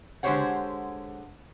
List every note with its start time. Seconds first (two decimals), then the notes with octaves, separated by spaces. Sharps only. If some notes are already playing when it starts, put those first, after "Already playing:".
0.23 D3 G#3 G4 C5 C#5 F#5